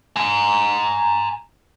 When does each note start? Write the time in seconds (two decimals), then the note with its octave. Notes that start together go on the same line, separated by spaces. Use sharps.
0.16 G#5 A#5